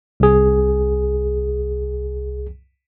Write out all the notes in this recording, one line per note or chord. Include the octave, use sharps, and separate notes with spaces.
C2 G#4